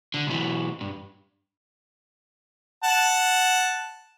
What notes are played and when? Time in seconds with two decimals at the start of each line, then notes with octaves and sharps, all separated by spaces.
0.14 D3
0.27 B1 E3
0.81 G2
2.84 F#5 A5